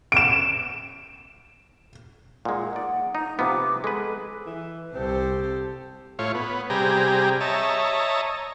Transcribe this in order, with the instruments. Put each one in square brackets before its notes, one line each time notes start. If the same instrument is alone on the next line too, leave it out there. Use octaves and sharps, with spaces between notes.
[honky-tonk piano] D7 E7
[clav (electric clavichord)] A#2 G#3 [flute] F#5
[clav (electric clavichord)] D#4 D5
[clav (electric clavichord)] D#4 [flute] A#5
[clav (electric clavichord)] C3 F3 B3 [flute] D6
[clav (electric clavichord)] G#3 B4 [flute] A4
[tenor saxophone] E3
[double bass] C2 [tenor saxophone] C4 [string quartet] G4 A4 C5
[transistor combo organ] A2 F4 C#5
B3
C3 G3 G4 G#4 A#5
C#5 D#5 E5 A5 A#5